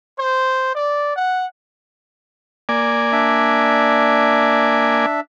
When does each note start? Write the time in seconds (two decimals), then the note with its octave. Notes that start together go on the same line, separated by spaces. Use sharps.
0.18 C5
0.74 D5
1.16 F#5
2.69 A#3 D5 G#5
3.12 D4 E5